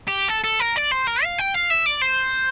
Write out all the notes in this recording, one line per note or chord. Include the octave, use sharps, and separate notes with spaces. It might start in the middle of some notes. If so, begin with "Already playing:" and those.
G4
A4
A4
A#4
D5
C5
A#4
F5
G5
F5
E5
D5
C5